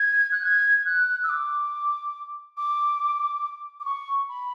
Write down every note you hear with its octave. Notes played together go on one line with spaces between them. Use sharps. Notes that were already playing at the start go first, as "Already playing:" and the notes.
Already playing: G#6
F#6
G#6
F#6
E6
D6
D6
D6
C#6
B5